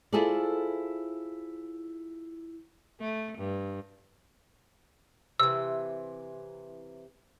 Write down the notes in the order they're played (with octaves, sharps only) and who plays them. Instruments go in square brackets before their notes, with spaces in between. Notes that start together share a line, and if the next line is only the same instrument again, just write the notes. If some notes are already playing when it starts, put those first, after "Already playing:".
[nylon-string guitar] E4 F4 G#4 A4 C5 D5
[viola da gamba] A3
G2
[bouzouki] C3 E3 [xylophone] E6